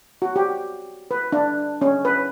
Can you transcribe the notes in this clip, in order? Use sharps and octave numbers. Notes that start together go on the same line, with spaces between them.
F#4
G4
B4
D4
C#4
B4